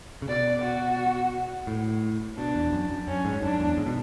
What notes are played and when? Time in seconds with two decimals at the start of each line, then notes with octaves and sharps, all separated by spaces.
0.22 C#3
0.28 B2 D5
0.62 F#4
1.67 A2
2.37 B2 D4
2.55 E2
2.72 F#2
2.90 F#2
3.07 F#2 C#4
3.25 G#2
3.42 F#2 D4
3.60 E2
3.77 G#2
3.86 B2